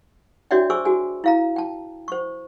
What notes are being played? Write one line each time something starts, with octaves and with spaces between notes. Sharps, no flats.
D4 F#4 C#5 D5 E5 G5
G#4 C5 G#5 C#6 D6 E6
F#4 G#4 G#5
E4 F5 A#5
G5 A5
C5 C#6